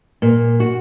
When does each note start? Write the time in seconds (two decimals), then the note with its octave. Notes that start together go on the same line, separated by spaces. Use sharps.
0.22 A#2
0.60 F#4